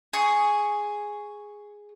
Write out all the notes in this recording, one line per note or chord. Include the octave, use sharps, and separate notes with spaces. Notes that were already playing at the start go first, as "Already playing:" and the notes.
G#4 C#6